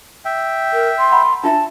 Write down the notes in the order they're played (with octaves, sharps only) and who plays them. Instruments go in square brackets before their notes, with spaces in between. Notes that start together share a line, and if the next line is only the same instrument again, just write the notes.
[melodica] E5 G5
[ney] A#4
C6
[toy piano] F#5 A#5 B5
[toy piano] D4 F4 E5 [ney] A5